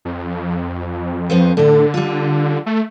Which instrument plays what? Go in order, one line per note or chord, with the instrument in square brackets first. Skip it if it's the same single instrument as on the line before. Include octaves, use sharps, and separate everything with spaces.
[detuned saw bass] F2
[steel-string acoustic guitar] F3 B3 C4
[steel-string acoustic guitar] A2 D5 [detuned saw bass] D3
[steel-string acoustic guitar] G3 F4
[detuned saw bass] A3